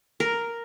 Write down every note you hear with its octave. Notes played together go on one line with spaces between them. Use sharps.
A#4